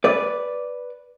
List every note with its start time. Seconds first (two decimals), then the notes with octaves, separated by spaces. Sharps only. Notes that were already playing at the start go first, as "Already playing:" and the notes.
0.04 B4 D5